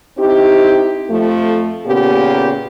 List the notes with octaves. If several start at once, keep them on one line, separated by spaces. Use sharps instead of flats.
C4 D#4 E4 G4
F2 F3 A3
A#2 C#3 A#3 B3 G4